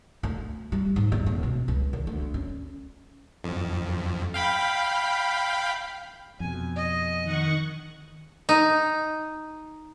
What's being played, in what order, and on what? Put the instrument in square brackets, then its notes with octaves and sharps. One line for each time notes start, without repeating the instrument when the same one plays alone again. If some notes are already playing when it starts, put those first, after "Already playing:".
[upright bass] D2
G3
G#2
E2
D#1
B2
C#2
D#3
D2
C#4
[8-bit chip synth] F2
F5 G5 B5
[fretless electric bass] F2 B2 [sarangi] G#5
[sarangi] D#5
[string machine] D#3 F#5 C#6
[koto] D#4